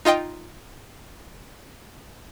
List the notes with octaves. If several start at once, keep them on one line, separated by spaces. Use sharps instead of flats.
D#4 F4 D#5 G5